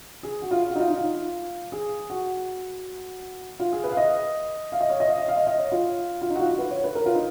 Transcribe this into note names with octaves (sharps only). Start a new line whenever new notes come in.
G#4
F#4
F4
F#4
D#4
F4
D#4
F4
G#4
F#4
F4
G#4
B4
F5
D#5
F5
D#5
C#5
D#5
F5
D#5
F5
D#5
D#5
C#5
F4
F4
D#4
F#4
F4
F#4
B4
C#5
B4
A#4
F4
D#4